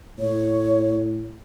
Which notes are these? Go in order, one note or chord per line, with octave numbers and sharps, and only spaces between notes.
A2 C#5